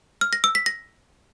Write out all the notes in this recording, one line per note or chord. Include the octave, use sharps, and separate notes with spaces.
F6
A#6
E6
B6
A#6